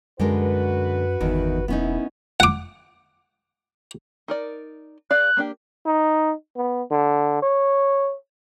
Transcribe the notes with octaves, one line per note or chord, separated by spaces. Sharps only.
F#2 D3 G#3 F#4 A#4 B4
G1 E2 D#3
E1 F#2 B3 C#4 D#4 E4
F#5 D6
D#4 A#4 D5
G#4 D5 F5 F#6
A#3 D4 G4
D#4
B3
D3
C#5